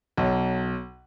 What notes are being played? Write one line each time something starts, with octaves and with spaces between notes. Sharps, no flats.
B1